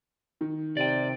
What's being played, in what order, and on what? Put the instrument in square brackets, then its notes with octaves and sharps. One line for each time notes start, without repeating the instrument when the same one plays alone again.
[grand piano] D#3
[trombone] C3 [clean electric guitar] D5 G5